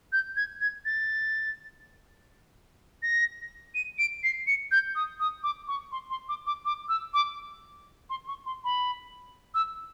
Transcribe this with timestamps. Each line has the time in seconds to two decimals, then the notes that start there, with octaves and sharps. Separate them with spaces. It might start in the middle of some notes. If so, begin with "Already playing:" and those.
0.13 G6
0.36 G#6
0.61 G#6
0.85 A6
3.03 A#6
3.75 D#7
3.99 D7
4.24 C7
4.47 C#7
4.72 G6
4.95 D#6
5.20 D#6
5.43 D6
5.68 C#6
5.92 C6
6.10 C6
6.29 D6
6.46 D6
6.65 D6
6.89 E6
7.14 D6
8.10 C6
8.28 C#6
8.46 C6
8.64 B5
9.55 E6